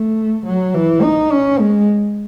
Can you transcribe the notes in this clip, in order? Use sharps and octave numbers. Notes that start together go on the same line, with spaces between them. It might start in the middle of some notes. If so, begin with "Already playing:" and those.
Already playing: A3
F#3
E3
D#4
C#4
G#3